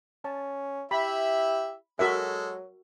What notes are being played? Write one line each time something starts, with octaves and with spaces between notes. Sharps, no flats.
C#4 A5
E4 G4 E5 B5
F#3 G#3 F#4 A4 A#4 E5